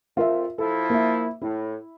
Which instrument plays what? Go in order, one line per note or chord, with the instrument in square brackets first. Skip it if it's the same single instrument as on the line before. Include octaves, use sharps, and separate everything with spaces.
[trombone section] F2 [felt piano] F4 A#4 E5
[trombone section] F3 E4 [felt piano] A4
[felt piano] A#3 E5
[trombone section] A2 [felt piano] E4